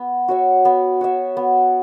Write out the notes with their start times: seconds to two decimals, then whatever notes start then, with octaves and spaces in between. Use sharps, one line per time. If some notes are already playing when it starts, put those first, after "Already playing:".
Already playing: B3
0.28 F#4 C#5 E5
0.65 B3
1.01 F#4 C#5 E5
1.37 B3